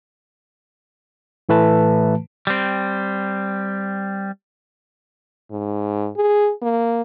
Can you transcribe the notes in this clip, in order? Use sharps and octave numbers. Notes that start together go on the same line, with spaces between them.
A2 E3 A3 B4 A5
G3 C4
G#2
G#4
A#3